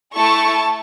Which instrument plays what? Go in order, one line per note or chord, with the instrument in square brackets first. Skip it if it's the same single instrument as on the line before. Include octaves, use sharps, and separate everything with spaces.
[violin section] A3 E4 A4 A5 C#6